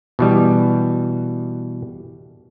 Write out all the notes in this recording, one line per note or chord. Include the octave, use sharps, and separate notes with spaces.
B2 E3 G3